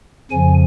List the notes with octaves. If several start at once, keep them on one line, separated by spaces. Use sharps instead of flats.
F2 C#3 F3 G#5